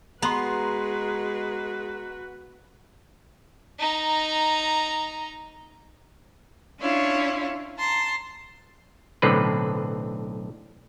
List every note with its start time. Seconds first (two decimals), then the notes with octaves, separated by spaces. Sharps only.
0.22 G#3 B3 F#4 B4 A#5 C6
3.79 D#4 A#5
6.80 C#4 D4 E4 F4 C#5
7.78 A5 A#5 C6
9.22 B1 A2 D3 C4 B4